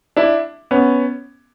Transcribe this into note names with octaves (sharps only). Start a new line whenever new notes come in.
D4 E4
B3 C#4